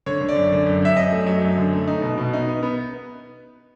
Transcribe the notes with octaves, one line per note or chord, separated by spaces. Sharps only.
D3 C#5
D3
D5
F#2
D3
F#2
F#2 E5
F#2 D#5
A3
F#3
F#2
D3
A3
D#4
B2
B2
D#4
B3
B3